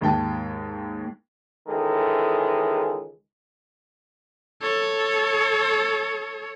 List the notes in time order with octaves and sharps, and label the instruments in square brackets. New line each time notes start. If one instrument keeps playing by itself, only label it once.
[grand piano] D#2 G#2 G5 A5
[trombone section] C#2 D#3 E3 G#3 A4
[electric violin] A4 C#5